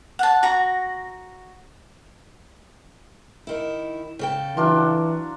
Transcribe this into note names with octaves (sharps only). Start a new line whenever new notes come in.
F#5 A5
F#4 A#5
D#3 E4
C#3 A4 G5
E3 F#3 D4 F4